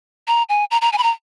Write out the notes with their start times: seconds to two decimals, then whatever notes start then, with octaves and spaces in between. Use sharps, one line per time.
0.28 A#5
0.49 G#5
0.71 A#5
0.82 A#5
0.93 G#5
0.98 B5
1.03 A#5